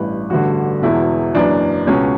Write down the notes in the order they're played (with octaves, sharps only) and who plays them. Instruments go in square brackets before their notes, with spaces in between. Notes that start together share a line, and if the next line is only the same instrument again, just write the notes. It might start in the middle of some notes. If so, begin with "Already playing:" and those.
Already playing: [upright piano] A1 G2 E3 B4
A1 G2 D3 F#4
E1 E2 B2 E4
F#1 F#2 E3 D4
C#2 B2 C#4